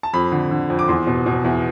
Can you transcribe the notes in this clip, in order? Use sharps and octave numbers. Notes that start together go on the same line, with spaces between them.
A5
F2 B5
D3
D3
F2
D6
E2 C6
B2
B2
E2